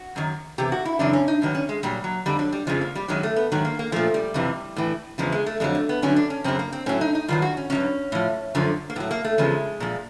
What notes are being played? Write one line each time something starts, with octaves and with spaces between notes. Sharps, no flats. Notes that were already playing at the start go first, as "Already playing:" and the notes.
Already playing: F#4
F#2 D#3 F#3
E2 C3 G4
F#4
E4
F#2 C#3 E3 D4
C#4
D#4
G2 D#3 F#3
C#4
G#3
A#2 F#3 G3
F#3
F2 D3 G3
F#3
G3
F2 C#3 F3 G#3
A#3
G3
F#2 D#3 F#3 G#3
A3
B3
G#2 D#3 F#3
A#3
A#3
A#2 F3 A3
G3
F2 C3 E3
A2 E3
E2 C#3 F3 G#3
G#3
A3
F2 D3 F#3 G#3
A3
B3
G2 D3 F#3 C#4
D4
C#4
F#2 C#3 F#3 C4
A#3
C4
A2 F#3 C#4
D#4
D#4
G2 D#3 F#3 F4
F#4
C#4
G2 D#3 F#3 C#4
A2 F3
F#2 D3 F3
A#3
A2 F#3 B3
A#3
A3
E2 C#3 F3 G#3
A#2 F3